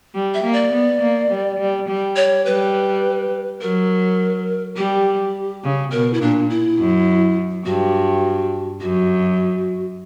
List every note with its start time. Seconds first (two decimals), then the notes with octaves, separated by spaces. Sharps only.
0.15 G3
0.34 E5
0.44 A#3
0.53 D5
0.73 B3
1.01 A#3
1.31 G3
1.59 G3
1.88 G3
2.16 C#5
2.46 G3 B4
3.61 F#3 A#4
4.77 G3 G4
5.64 C#3
5.92 B2 A#4
6.14 E4
6.21 A#2 D4
6.50 E4
6.79 F#2
7.65 G2 F#4
8.81 F#2 F#4